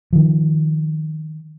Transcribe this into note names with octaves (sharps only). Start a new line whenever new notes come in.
D#3 F3